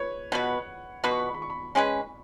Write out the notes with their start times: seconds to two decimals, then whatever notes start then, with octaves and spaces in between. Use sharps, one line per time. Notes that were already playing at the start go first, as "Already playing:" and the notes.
Already playing: B4 C#5
0.32 B2 B3 F#4 B4 F#5
1.04 B2 B3 F#4 B4 B5
1.11 C#6
1.19 B5
1.27 C#6
1.34 B5
1.42 C#6
1.50 B5
1.75 G#3 C#4 G#4 B4